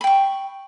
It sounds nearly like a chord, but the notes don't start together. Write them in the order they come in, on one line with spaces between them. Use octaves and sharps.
B5 G5 C#6